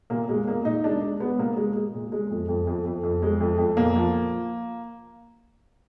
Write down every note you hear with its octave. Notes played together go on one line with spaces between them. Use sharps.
A#2 A#3
A#2 G#3
A#2 A#3
A#2 D#4
G#3 D4
G#3
G#3 B3
A#2 A#3
G#3
G#3
A#2
G#3
F2
F2
F2
F2
F2
G#3
F2
F2
A#2 A#3
F3